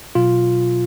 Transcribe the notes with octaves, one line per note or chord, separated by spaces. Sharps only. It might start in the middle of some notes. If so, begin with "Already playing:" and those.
B2 F#3 F4